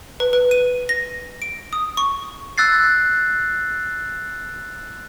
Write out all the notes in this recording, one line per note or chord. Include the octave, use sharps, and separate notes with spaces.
B4
B4
D#7
A#6
D7
D#6
C#6
E6 F#6 A6 C7